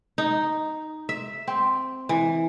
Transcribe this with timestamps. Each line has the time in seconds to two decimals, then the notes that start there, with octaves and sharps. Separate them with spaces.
0.18 D#4
1.09 E5
1.47 C4
2.09 E3